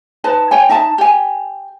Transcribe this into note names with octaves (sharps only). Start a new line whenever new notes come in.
D#4 B4 C5 A5
C#5 G5 G#5
D#4 E5 A5
G4 G#5